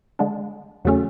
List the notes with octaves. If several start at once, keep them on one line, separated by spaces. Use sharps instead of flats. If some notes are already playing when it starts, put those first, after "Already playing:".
D3 G#3 D4
E2 C#3 F#3 A3 C#4